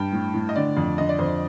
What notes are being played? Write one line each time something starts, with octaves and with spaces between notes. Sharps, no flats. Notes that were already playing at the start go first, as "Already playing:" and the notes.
Already playing: G2 G5
A2
A2
D#5
D3 D5
F2
D3 D#5
D5
F2 C5